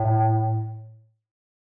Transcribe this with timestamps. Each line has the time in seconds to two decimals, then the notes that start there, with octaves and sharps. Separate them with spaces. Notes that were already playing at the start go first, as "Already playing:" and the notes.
Already playing: A2